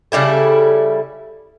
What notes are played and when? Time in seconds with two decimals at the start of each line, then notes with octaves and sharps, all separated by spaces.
0.12 C#3 G3 E4 A4